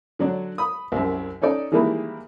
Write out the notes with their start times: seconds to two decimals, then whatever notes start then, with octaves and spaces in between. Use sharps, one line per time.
0.19 D3 F#3 D4
0.58 B5 D#6
0.92 C2 F#2
1.42 C#4 D#4 A4 D5
1.72 D#3 E3 G3 G#3 A#3 E4